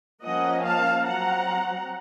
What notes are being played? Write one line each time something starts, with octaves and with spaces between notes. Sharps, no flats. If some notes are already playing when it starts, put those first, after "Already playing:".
F3 A#3 C#4 D#5 F#5
F5 A5
F#3 C4 F#5 A#5